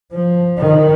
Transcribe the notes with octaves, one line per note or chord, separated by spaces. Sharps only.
F3
D#3